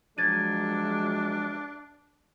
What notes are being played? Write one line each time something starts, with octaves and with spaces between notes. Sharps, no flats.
F3 F#3 G#3 D4 G#6 A6 D#7